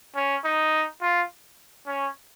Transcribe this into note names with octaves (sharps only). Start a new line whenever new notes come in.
C#4
D#4
F4
C#4